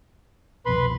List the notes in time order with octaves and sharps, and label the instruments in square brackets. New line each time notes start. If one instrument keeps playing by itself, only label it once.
[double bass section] C2 F2 B2 [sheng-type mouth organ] B4 B5 C6